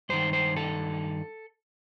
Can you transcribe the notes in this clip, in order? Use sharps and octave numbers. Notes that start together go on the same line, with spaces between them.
G2 D#3 C5
C5
A4